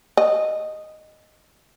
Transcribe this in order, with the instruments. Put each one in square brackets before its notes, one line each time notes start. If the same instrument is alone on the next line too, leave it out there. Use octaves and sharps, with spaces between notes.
[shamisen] D#5